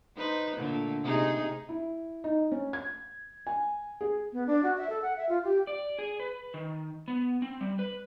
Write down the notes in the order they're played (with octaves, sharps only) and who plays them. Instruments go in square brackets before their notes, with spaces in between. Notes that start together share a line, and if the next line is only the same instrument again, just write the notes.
[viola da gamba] D#4 B4 C5
A#2 D3 A3
C3 D#4 G#4
[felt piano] E4
D#4
C#4
G#6
G#5
G#4
[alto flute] B3
D4
F#4
E5
A4
F#5
E5
F4
G4
[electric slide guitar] D5
G#4
B4
D#3
B3
C4
G3
B4